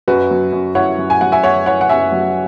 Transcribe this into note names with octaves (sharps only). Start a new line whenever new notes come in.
F#2 F#4 B4
F#3
F#2
E4 C#5 F#5
F#2
G#5
F#3 F#5
E5 G#5
F#2 C#5 F#5
E4 C#5 F#5
F#5
F#2 E5 G#5
F#3